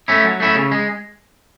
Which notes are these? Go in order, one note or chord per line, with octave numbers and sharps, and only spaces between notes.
A3 C#4 E4
F#3
A3 C#4 E4
C#3
G#3